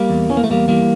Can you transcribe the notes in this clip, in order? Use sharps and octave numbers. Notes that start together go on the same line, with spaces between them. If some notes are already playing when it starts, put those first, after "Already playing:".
Already playing: G3 A#3
E2
E3 C#4
A#3
A3
E2 G3 A#3
E3 G3 A#3